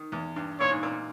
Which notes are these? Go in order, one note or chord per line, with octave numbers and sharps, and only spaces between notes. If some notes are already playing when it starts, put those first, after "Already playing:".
Already playing: D#3
E2
G2
A#2 C#5
G#2
A#2